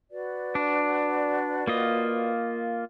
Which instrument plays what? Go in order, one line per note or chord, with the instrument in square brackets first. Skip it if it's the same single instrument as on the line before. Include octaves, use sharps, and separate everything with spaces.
[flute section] F#4 B4 D5
[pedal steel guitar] D4
A#3 F4 D#5